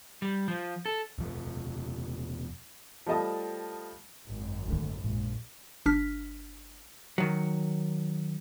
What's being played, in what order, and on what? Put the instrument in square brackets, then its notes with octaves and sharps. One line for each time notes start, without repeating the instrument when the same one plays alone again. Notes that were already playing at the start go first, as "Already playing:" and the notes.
[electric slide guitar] G3
F3
A4
[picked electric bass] E1 F3
[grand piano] F3 G3 A3 D#5 A5 D#6
[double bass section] G#1 F#2
[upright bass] D3 A3
[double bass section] A#1 [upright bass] G#2
[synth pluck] G1 D4 F6 B6
[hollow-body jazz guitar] D#3 F#3